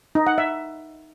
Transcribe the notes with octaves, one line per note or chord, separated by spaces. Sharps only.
D#4
F#5
E5